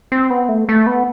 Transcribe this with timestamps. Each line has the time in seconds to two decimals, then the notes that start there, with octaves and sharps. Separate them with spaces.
0.12 C4
0.30 B3
0.49 A3
0.69 A3
0.87 B3